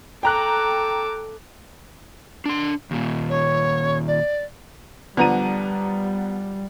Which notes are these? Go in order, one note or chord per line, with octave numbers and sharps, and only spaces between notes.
A4 G5 A#5 D6 F#6
D4 C6
D#2 A#2
C#5
D5
D3 F3 G3 B3 A#5 D#7